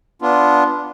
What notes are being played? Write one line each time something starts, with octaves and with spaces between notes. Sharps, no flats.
B3 D4 F4